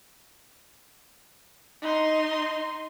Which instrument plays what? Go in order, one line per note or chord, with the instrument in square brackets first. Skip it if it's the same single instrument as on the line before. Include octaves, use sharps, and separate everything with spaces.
[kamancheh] D#4 C6